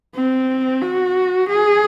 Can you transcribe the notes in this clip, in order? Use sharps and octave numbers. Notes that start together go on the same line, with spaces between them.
C4
F#4
G#4